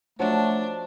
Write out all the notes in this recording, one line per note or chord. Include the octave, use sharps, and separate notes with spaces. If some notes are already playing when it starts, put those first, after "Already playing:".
F3 F#3 A3 D4